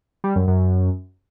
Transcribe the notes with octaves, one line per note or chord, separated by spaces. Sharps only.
G3
F#2
F#2